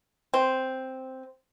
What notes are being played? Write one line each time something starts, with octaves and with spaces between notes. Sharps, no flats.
C4